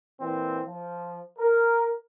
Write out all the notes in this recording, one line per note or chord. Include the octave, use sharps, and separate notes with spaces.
A#2 E3 C4
F3
A#4